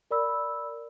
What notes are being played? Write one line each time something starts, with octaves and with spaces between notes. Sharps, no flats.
A#4 D5 B5 E6